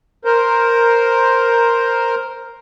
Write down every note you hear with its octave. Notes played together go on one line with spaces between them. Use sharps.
A#4 C5